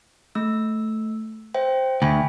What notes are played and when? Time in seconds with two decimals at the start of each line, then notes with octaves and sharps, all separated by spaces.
0.35 A3 E6
1.54 C5 E5 G5
2.02 D2 G5 G#5 B5